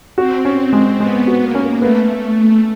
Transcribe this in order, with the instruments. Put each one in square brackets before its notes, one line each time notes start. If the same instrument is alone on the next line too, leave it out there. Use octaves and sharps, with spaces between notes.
[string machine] C4 [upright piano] F#4
[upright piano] C#4
G#3
[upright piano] G#3 [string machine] B3
[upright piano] F#4
[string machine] A#3
[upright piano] C#4
[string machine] A3 [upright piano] B3